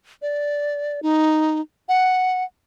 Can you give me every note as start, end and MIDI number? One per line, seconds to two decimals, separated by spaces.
0.22 1.00 74
1.03 1.61 63
1.89 2.44 78